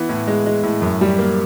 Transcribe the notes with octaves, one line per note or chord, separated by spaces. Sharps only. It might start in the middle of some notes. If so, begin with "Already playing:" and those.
Already playing: E3 B3
A2
G#3
G#3
A2
F#2
G3
A#3